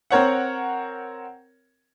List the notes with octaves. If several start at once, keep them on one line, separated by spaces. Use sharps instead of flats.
C4 A#4 C#5 F#5